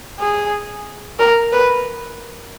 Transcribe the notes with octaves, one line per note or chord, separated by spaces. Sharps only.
G#4
A#4
B4